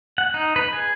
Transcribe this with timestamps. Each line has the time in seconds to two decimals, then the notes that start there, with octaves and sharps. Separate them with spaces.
0.18 F#5
0.34 D#4
0.56 B4
0.72 G#4